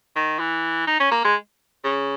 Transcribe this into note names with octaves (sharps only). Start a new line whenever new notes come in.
D#3
E3
D#4
C#4
A#3
G#3
C#3